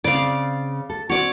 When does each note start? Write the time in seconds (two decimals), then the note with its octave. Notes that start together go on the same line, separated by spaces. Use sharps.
0.04 C#3 C4 D5 F5
0.90 A4
1.10 C4 F#4 C#5 D5